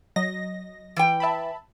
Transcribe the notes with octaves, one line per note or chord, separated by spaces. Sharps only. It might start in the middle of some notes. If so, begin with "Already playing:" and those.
F#3 D#5 A#6
E3 G5
E5 A5 B5